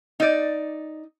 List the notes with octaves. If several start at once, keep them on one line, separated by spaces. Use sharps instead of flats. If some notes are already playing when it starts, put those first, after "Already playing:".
D#4 D5